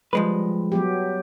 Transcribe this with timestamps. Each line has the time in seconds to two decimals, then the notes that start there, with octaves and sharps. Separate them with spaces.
0.13 F3 G3 G#3 B4
0.72 F#3 B3 G4